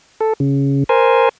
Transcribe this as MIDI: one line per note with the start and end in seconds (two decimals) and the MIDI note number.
0.21 0.33 69
0.40 0.84 49
0.89 1.29 70
0.89 1.29 72
0.89 1.29 80